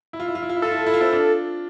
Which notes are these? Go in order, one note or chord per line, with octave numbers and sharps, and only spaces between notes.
E4
F4
E4
F4
E4
F4
E4
F4 A4
E4
F4
E4
F4
C4 E4
D4 F4